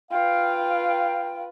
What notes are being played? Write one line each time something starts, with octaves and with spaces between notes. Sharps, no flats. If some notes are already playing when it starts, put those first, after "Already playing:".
F4 B4 F5 G5